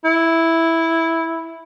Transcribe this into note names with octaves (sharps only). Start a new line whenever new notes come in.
E4